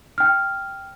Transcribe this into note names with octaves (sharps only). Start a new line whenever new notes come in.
G5 F6